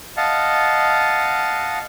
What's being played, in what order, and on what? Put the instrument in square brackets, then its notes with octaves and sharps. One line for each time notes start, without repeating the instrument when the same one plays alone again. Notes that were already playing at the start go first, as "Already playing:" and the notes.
[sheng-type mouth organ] D#5 F5 F#5 A5